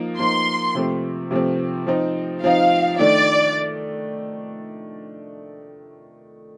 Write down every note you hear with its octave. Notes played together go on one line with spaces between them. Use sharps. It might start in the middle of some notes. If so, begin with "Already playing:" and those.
Already playing: F3 A#3 D#4
F3 A#3 D#4 C6
C3 F3 A3 C4
C3 F3 A3 C4
F3 C4 D#4
F3 C4 D#4 F5
D#3 A3 D4 D5